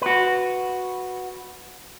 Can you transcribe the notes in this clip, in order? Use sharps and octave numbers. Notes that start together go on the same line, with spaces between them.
F#4 B4